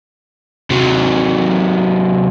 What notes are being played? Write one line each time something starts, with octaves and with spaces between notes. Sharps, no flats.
C3 F#3